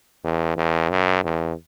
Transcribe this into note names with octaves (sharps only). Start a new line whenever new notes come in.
E2
E2
F#2
E2